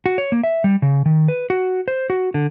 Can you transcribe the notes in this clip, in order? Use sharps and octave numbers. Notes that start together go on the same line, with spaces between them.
F#4
C#5
A#3
E5
G3
C#3
D#3
B4
F#4
C5
F#4
D3